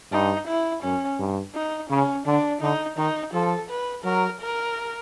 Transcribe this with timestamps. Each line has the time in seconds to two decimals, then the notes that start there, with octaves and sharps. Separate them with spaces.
0.12 G2 D#4
0.48 E4
0.83 F#2 C#4
1.19 G2
1.55 D#4
1.90 C#3 C#4
2.26 D3 D4
2.61 D3 D#4
2.97 D#3 D#4
3.33 F3 A4
3.70 B4
4.05 F#3 A#4
4.41 A#4